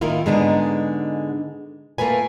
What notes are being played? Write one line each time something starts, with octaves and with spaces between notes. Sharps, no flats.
A2 D#3 A#3 E4 F4
G#2 D3 G#3 B3 D4 D#4
A3 A#3 F4 B4 G#5